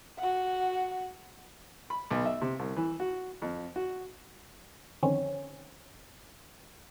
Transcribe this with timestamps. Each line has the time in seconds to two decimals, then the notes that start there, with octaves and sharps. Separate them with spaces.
0.18 F#4 F#5
1.90 B5
2.11 B1
2.25 E5
2.41 C3
2.59 C2
2.77 E3
3.00 F#4
3.42 F2
3.76 F#4
5.03 F2 D3 D#3 C4 C#4